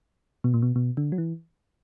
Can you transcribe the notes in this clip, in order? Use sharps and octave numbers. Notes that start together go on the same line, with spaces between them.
B2
A#2
B2
B2
D3
F#3
E3